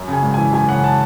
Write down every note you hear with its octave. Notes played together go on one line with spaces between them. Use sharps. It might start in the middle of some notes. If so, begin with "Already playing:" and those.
Already playing: F#2
C#3 G#5
G#1
E3 G#5
F#2 G#5
C#3 F#5
A5